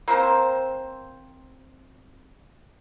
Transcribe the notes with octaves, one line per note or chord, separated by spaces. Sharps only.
A#3 C4 C5 A5